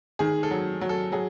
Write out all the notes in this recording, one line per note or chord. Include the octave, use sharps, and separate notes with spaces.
D#3 G#4
A4
F#3
F#3
A4
F#3 G#4